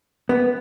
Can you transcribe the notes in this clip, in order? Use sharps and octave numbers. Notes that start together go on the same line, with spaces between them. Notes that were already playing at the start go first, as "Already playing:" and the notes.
B3